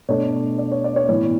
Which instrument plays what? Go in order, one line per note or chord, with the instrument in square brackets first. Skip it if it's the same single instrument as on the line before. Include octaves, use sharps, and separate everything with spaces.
[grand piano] B2 A3 D4 C#5
D5
C#5
D5
C#5
A2 E3 B3 C#5